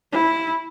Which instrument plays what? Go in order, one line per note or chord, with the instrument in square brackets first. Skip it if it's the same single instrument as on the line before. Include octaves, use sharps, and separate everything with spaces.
[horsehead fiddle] E4